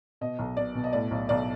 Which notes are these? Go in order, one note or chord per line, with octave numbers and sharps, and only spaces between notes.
B2 D#5
B1
B2 D5
B2
D#5
A2 D5
B1
B1 D5